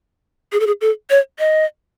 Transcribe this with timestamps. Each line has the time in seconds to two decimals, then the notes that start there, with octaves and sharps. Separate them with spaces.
0.52 G#4
0.60 A4
0.67 G#4
0.81 A4
1.10 C#5
1.39 D#5